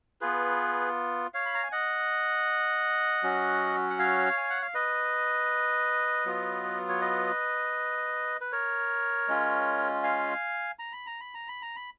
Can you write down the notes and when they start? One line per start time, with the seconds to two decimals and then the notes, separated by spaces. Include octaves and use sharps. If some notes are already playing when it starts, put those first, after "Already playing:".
0.21 B3 F4 G#4 B4
1.34 C#5 F5
1.46 B5
1.54 A#5
1.63 G#5
1.72 D#5 F#5
3.23 F#3 C#4 F#4
3.90 F#5
3.99 C#5 F5
4.37 G#5
4.50 F#5
4.62 F5
4.74 B4 D#5
6.26 F#3 B3 F4
6.89 C#5
7.01 B4 D#5
8.41 B4
8.52 A#4 C#5
9.28 G#3 C#4 F4
10.03 F5 G#5
10.79 A#5
10.93 B5
11.07 A#5
11.20 B5
11.35 A#5
11.48 B5
11.62 A#5
11.76 B5